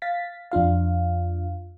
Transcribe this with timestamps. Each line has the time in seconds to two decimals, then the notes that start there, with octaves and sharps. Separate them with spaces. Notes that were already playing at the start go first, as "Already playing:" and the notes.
0.02 F5 A6 B6
0.52 F2 D4 F4 F5